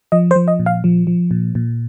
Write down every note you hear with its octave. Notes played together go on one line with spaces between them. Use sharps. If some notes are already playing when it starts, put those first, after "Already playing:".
F3 D#5
C5
F3
D#5
A#2
F5
F3
F3
A#2
A#2